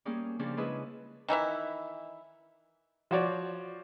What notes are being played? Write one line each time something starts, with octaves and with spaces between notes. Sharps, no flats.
G3 A#3 C#4 G#4
C#3 F3 G3 C#4 D4
G#3 E4 G#4 B4
D#3 E3 E4 E5
F3 F4 F#4 C#5 D5